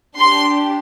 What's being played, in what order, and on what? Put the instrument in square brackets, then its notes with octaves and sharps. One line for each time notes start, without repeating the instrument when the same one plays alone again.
[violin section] D4 G4 C6